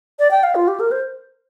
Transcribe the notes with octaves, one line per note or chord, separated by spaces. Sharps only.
D5
G5
F5
F4
G4
A#4
C5